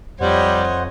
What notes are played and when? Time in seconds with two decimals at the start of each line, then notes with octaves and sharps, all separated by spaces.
0.21 F2 G3 C5 C#5 D#5 F#5